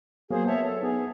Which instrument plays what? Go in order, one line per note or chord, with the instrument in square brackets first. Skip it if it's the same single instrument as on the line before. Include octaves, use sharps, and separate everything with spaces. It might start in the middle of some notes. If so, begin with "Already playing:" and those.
[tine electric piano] F#3 A#3 B3 [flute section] G#4 C5 F5
[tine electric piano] B3 [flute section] C#5 E5 A5
[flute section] A4
[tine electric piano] B3 D#4 [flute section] G#4